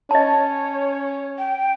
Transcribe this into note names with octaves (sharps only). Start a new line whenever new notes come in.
C#4 C#5 D#5 A5
G5